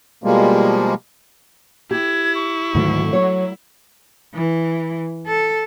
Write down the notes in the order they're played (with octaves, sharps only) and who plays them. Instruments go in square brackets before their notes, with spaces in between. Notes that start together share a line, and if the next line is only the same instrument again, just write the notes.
[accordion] B2 F3 G3 G#3 A#3
[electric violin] E4 [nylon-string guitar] G4 [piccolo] G#6
[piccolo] C#6
[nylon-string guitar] D2 [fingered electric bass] G#2 D#3 F#3
[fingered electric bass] F#3 [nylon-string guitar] C#5
[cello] E3
A4